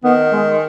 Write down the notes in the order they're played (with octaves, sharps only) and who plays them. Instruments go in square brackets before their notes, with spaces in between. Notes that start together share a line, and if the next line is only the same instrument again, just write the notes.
[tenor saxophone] D#3 [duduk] B3
[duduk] G#3